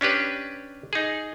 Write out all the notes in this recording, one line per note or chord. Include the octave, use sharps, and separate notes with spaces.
C#4 D4 G4 B4
D#4 G#4